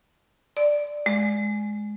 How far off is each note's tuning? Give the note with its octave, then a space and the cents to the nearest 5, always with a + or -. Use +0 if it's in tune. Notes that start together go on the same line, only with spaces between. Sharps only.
D5 +5
G#3 +10